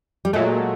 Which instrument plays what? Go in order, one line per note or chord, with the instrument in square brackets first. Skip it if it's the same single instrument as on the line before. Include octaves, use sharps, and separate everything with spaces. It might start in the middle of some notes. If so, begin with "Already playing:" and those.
[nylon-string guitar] G3
[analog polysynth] A#2 F#3 A3 [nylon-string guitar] G#3